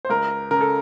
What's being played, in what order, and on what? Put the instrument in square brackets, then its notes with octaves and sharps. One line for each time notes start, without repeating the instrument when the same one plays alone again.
[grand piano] C5
C#2 A#4
C#3 A#4
A4